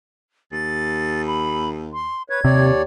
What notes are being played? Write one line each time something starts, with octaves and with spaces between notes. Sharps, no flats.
D#2 A6
B5
C6
B4 C#5 G#6
D#2 C3 C#5 D5